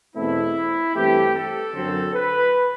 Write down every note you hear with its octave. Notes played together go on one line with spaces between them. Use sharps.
E2 B2 A3 C4 E4
G2 E3 A3 C4 G4
A4
F#2 D3 F#3 C4
B4